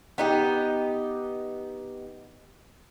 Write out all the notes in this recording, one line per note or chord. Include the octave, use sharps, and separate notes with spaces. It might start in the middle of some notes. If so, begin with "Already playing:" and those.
B3 D#4 G4